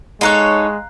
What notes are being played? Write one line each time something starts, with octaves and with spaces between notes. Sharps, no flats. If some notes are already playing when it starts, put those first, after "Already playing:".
G#3 D#4 A4 C#5 F5 A#5 F#6